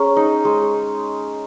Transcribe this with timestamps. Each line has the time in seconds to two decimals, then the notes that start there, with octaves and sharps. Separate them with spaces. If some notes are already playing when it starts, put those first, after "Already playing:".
Already playing: C#4 G#4 C#5 A#5 C#6
0.16 D#4
0.45 G#3